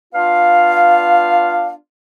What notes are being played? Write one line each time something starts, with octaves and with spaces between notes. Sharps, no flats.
B3 D4 F4 F5